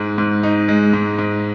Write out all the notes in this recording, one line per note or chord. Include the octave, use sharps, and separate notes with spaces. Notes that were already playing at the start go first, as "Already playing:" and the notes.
Already playing: G#2 G#3
G#2
D#4
G#3
G#2
G#2